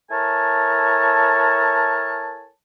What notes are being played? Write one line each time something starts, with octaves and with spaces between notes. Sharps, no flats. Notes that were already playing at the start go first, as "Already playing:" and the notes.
E4 A4 A#4 C#5 G#5 A5